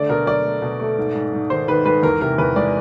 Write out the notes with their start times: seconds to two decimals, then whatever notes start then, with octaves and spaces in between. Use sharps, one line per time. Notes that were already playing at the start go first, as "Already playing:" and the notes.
Already playing: D3 A3 D5
0.09 B2 A#4
0.26 F#3 D5
0.44 A3
0.62 B2
0.80 A3
0.98 G#2
1.15 G#2
1.33 G#2
1.50 D#3 C5
1.68 D#3 B4
1.85 G#2 B4
2.03 E2 A#4
2.21 C3 A#4
2.38 E2 B4
2.56 G#3 D5